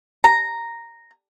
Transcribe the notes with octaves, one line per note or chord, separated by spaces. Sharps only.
A#5